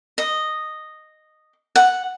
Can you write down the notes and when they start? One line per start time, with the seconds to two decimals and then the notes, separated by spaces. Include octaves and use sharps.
0.18 D#5
1.76 F#5